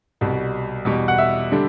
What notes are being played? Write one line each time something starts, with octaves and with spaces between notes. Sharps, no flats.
C2 B2 G3
E2 B2 G3
F#5
E5
D3 G3 D4